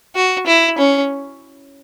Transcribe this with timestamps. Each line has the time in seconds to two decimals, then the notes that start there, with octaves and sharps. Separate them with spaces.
0.15 F#4
0.47 E4
0.78 C#4